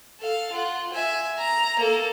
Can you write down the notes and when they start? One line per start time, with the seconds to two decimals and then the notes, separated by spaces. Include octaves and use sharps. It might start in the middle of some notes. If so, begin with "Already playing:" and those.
0.20 A4 F5
0.52 F4 F#5
0.93 E5 G#5
1.38 A#5
1.79 A#3 A4